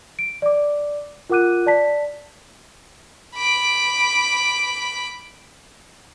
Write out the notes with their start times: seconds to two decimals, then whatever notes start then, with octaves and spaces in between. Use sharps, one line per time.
0.19 D7
0.42 D5 D6
1.30 F4 A#4 F#5 D6 F#6 D#7
1.66 D5 A5 B6
3.36 B5 D6